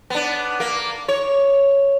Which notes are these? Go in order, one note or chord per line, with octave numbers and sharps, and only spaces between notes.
B3 D4
A#3
C#5